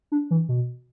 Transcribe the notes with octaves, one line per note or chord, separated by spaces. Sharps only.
D4
E3
B2